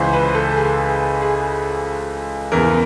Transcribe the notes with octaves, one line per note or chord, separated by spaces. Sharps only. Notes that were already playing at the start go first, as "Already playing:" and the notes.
Already playing: C#2 C#3 E3 C5
B4
A4
G#4
G#4
E2 C#3 E3 A#4